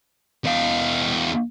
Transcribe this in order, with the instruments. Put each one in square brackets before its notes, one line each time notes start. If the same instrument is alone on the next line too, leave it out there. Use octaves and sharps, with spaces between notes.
[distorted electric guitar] E2 F5